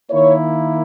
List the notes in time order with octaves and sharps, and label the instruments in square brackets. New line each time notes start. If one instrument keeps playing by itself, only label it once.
[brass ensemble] D#3 A#3 E4 C#5